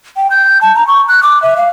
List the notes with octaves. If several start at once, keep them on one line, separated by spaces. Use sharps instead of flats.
G5
G6
A5
A#5
C#6
F#6
D6
E5
F5